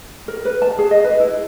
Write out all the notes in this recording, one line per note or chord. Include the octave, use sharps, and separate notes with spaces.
A#4
B4
A5
G#4
D#5
B4
E4